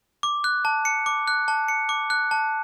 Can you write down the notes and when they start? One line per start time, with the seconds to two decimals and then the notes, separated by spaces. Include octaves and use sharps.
0.23 D6
0.44 F#6
0.65 A5
0.85 C#7
1.06 D6
1.28 F#6
1.48 A5
1.68 C#7
1.89 D6
2.10 F#6
2.31 A5